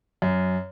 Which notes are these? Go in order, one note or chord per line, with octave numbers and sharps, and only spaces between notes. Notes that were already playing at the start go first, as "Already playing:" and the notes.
F#2